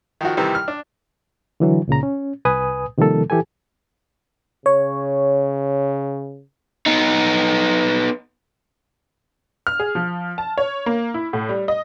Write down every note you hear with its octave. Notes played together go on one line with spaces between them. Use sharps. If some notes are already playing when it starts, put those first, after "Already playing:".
D#3 F3 F#4
C3 D#3 E3 G3
F6
D4
D3 E3 F#3
C#2 A#2 C#3 A#5
C#4
C2 B4 G#5 D#6
C3 D#3 F3 G3 A#3 A4
E3 G4 A4 G#5
C#3 C#5
B3 D#4
F6
G#4
F3
A5
C#5
A#3
E4
A2
G3
D#5